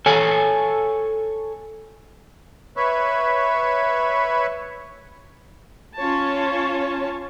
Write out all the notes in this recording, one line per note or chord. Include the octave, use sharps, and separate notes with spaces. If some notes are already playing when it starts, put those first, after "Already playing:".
A4 C#5 G#5
B4 C#5 E5 B5 C#6
C#4 F4 C#5 A5